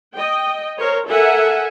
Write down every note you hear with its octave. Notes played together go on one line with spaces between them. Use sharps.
D#5 G5
A#4 C5 C#5
A4 A#4 E5 F#5 G#5